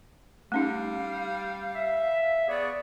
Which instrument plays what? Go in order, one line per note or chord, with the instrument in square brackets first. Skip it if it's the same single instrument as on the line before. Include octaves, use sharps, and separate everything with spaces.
[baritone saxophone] G3 [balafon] A3 C#4 D#4 [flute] F5
[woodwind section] E5
[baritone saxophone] B3 [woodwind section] G#4 C#5 D5